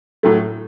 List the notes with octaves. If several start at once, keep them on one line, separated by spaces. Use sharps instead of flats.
A2 F#3 A3